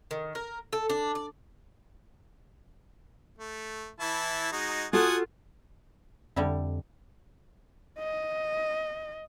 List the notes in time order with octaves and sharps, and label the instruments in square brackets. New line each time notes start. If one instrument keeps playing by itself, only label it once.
[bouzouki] D#3
A#4
A4
D4
D5
[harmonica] A3
E3 E4 A5
G#3 D#4 F#4
[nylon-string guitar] F4 F#4 A4 [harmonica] F#5 G#5 D#6
[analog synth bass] F2 [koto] D3 G3 E4
[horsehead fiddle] D#5